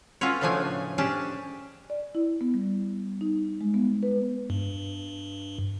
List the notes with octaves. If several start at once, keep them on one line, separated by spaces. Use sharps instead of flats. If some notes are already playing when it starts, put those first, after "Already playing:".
C#4 F4 F#4 A4 B4 C#5
A2 C#3 F3 A3 D4 G#5
C#4 D4 G4 G#4 A5
D5
E4
B3
G3
D#4
G#3
B3
B4
G2